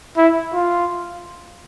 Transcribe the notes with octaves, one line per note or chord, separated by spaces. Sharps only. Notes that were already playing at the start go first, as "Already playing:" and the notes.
E4
F4